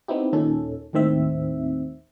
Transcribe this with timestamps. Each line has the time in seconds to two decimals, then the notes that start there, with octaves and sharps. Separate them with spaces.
0.08 B3 C4 D#4 E4 G4
0.33 D#2 A#2 D#3 C#4 A4
0.93 D#2 A2 D#3 C4 E5